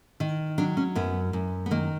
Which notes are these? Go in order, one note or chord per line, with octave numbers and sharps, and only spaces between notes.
D#3
F#3 D4
C#4
F#2 B3
F#2
B3
D#3 A#3